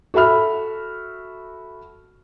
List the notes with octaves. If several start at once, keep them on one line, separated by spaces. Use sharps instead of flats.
F#4 A4 E5 B5 F6